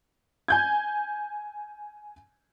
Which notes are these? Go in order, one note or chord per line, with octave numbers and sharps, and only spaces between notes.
G#5 G6 G#6